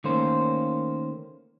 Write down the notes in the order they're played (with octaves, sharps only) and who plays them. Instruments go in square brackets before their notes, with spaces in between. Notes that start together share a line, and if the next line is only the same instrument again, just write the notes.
[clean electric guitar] D#3 A3 A#3 C#4 C5